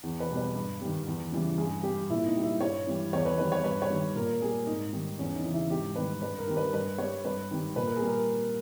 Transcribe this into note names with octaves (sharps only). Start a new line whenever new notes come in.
E2
B4
B2 G3
B4
G2
D#3 G3
E2
C#3 E3 G3
G2 G#4
G3 G4
A#2 E4
D#4
G3
E4
G2 C#5
E3 G3
E2 C#5
B4
D#3 G3 B4
C#5
G2 B4
C#5
D#3 G3
A#2 A#4
G3 G#4
G#2 D#4
D#3 G3
E2 C#4
D#4
C#3 E3
E4
G#2 G4
D#3 G3 B4
G2 B4
A#4
D#3 G3
B4
G2 B4
G3 C#5
G2 B4
D#3 G3
A#2 B4
A#4
G#4
G3
A#4